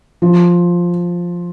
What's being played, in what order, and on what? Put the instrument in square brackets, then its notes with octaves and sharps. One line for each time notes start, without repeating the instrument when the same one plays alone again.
[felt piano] F3